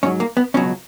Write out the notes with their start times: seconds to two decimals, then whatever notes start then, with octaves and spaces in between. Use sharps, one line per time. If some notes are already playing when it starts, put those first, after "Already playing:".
0.03 G#2 F#3 C#4
0.20 A#3
0.37 B3
0.54 C#2 B2 F#3 C#4